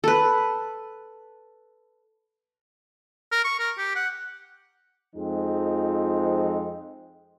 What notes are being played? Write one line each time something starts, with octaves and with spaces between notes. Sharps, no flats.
A4 B4
A#4
C#6
A#4
G4
F#5
F2 F3 G#3 C4 D#4